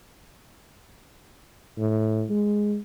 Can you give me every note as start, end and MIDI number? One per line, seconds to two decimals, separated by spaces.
1.78 2.24 45
2.30 2.78 56